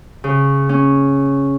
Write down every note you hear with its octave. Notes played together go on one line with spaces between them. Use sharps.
C#3
C#4